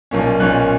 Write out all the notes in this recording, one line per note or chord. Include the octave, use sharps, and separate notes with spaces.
B1 A#2 A#3 C#4
B1 A#2 A#3 C#4 F#6